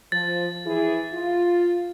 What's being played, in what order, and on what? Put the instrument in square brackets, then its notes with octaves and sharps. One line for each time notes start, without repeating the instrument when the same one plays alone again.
[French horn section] F3 [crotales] A6
[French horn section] E3 E4 G#4
F4